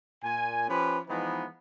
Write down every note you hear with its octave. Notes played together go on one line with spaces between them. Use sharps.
A#2 G#5
F3 C#4 G4 B4
E3 F3 G#3 B3 D#4